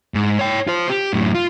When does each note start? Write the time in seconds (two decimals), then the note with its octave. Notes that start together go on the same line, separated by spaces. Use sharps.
0.14 G#2
0.39 C#5 G5
0.67 F4 C5
0.89 G4
1.13 F#2 A2
1.34 F4